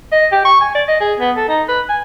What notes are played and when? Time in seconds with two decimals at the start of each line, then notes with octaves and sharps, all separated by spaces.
0.12 D#5
0.32 G4
0.45 C#6
0.61 G#5
0.75 D5
0.88 D#5
1.00 G#4
1.20 B3
1.36 A4
1.48 D#4
1.68 B4
1.89 G#5